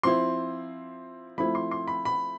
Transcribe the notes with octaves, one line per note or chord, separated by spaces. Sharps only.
F3 C4 E4 C6
F3 A3 C4 E4 B5
C6
C6
B5
B5